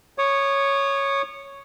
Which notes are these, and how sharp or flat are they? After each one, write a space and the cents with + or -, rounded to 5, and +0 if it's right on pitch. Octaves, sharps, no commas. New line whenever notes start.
C#5 +0 D#6 -35